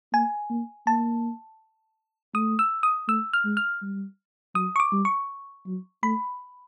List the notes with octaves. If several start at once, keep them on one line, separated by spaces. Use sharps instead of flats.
A#3 G#5
A#3
A#3 A5
A3 D#6
E6
D#6
A3 E6
F6
G#3
F6
G3
F#3 D#6
C#6
D6
G3
C#6
F#3
A3 B5